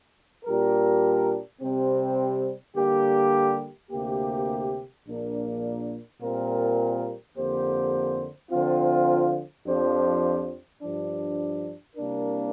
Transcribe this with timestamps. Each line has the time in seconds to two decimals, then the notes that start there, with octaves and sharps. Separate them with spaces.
0.45 A#2 G3 D4 G4 A#4
1.60 C3 G3 C4
2.75 D3 G3 A#3 G4
3.91 D2 C3 A#3 G4
5.06 A#1 A#2 A#3 D4 A#4
6.20 A#2 G3 C4 F4 A#4
7.36 F2 D3 A#3 G4 C5
8.51 D3 F3 C4 F4
9.66 F2 F3 D4 G4 C5
10.81 G2 F3 D4
11.96 C2 C3 A#3 D4 A#4